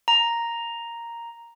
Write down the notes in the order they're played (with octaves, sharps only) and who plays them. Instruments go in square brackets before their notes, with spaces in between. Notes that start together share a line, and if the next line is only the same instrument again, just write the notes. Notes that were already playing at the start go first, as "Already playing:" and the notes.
[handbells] A#5